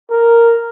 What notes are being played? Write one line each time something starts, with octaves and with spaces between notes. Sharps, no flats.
A#4